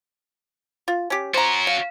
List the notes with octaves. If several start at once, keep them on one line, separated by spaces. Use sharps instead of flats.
F4
C#4 G4
C#4 F#4 C5 A#5
F5